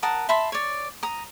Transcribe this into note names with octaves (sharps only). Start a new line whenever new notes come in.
A#4 F#5 A5 D#6
E5 A5 B5 C6
C#5 D5
A#5 D#6